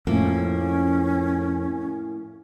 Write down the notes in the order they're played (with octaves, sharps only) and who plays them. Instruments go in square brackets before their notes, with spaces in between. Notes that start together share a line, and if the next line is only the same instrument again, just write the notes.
[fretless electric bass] F2 [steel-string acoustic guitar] A2 A#3 [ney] C#4